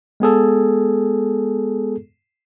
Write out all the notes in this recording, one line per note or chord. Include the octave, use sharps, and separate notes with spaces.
G#3 B3 G#4 A4